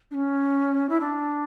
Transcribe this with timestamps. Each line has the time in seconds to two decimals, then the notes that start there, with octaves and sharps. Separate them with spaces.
0.11 D4
0.14 C#4
0.89 E4
1.00 D4